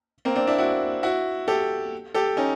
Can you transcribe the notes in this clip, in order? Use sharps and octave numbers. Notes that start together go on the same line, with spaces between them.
A#3 C4
C4 D4
D4 E4
E4 F#4
E4 F#4
G4 A4
G4 A4
C#4 D#4